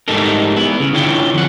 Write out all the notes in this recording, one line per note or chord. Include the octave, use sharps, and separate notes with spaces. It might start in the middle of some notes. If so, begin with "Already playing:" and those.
G#2 G3 A3 D#4 A4 A#4
B3 E4
C#3
D3 E4 F4 C#5 E5 G5
F2 F#5